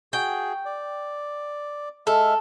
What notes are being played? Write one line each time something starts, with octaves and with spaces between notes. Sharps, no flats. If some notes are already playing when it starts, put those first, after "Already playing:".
F#4 G#4 G5
D5
G#3 A4 E5 F6